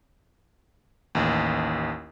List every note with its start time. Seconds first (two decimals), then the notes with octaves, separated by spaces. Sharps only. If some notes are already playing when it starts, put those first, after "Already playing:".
1.15 A1 D#2